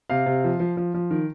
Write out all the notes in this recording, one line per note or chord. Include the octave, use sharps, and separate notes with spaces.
C3 F5
C3
F3
F3
F3
F3
D#3